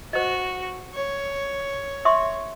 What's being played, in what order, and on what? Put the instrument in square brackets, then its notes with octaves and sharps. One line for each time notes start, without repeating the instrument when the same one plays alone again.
[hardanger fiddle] F#4 [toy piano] C5 D#5
[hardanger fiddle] C#5
[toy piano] E5 C6 C#6